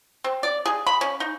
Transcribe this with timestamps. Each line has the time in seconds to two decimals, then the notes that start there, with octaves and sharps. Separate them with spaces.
0.24 C4
0.43 D5
0.66 G#4
0.87 B5
1.01 C#4
1.20 D#4